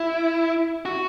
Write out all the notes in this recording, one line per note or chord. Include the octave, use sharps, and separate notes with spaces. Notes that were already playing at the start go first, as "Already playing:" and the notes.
Already playing: E4
F#4